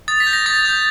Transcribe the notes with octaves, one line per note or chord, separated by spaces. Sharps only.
D#6 A6
B6
G6
A#6
D#6 A6
G6